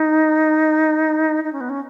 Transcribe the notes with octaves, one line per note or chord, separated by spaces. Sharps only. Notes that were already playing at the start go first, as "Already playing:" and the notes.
Already playing: D#4
D#4
C#4
B3
C#4